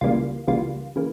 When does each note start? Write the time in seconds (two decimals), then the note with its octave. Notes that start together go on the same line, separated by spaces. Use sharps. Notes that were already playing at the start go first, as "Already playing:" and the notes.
0.01 C#2 C#3 E3 G3 A#3 F4
0.47 C#2 C#3 E3 G3 A#3 F4
0.96 C#3 E3 A#3